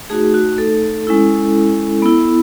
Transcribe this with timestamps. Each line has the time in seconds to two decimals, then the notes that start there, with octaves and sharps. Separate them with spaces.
0.10 A3 D#4 F#4 G#4
0.34 F#4
0.58 A4
1.07 G#3 C#4 E4
2.02 B3 E4